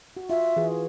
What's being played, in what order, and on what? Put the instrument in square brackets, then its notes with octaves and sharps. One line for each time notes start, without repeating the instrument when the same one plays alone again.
[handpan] F#4
[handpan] F4 [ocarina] E5
[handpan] E3 G#4